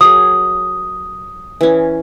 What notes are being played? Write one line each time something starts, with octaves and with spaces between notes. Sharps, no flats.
F#3 G#4 A#4 D#6
E3 C#4